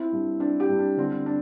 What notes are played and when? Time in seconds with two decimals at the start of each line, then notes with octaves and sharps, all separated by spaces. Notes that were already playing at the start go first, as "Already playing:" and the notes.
Already playing: C4 E4
0.12 G2
0.40 C4 D4
0.60 G4
0.69 G2
0.79 D4
0.97 D3 C4
1.26 D4